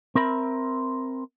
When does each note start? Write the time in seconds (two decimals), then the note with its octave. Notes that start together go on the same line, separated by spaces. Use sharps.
0.15 C4 A#4 E5 B5